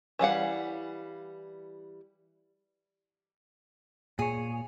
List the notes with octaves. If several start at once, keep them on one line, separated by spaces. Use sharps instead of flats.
E3 G3 F5 F#5
A#2 G#4 C#5